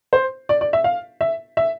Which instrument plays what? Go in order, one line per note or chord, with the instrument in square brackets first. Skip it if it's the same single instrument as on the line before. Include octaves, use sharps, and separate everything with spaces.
[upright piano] C5
D5
D5
E5
F5
E5
E5